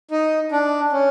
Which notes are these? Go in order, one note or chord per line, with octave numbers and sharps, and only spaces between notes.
D#4
D4
C#4